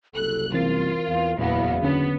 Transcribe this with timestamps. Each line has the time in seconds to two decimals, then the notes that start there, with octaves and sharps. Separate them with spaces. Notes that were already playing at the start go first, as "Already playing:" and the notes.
0.15 F#1 C2 A4 F#6
0.54 E3 C4 F4 A#4 A6
1.08 E2 F5
1.39 F#1 E2 A#2 B3 F5
1.83 D3 B3 C#4